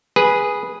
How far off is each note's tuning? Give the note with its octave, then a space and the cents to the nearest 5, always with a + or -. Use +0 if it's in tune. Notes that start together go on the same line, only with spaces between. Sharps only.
G#4 -5 B4 -10